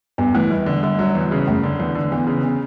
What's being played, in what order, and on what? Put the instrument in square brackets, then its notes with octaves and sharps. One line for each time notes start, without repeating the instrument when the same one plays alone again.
[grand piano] G2 [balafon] B3
[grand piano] E3 [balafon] A3
[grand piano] E2 [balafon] G3
[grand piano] D3
[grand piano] D3 [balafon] G3
[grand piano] F#3 [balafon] G3
[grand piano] E2
C#3
[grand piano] F#2 [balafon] A3
[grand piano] D3
E2
D3
[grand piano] E2 [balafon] B3
[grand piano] C#3
[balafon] B3